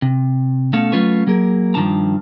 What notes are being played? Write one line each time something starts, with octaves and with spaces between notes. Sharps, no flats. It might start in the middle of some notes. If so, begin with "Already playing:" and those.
C3
B2 A3 C#4 A4 F5
F#3 A3 C#4 F4 B4 C#5
F#3 A#3 G#4 A#4
G2 D#3 F3 D4 A5 A#5